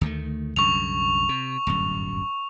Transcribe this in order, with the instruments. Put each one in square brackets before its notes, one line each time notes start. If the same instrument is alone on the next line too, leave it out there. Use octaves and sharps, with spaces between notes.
[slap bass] D2 D#3 A3
[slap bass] C2 F#2 D3 [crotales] C#6 F7
[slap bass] C3
D1 G1 F#2